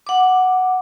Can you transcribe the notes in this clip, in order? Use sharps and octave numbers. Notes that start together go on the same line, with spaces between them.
F#5 D6